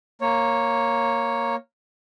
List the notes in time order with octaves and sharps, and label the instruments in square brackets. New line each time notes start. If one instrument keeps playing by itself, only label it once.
[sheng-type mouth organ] A#3 C#5